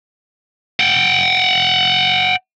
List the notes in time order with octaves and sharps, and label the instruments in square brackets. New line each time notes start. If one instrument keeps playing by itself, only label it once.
[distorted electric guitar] F#5 G5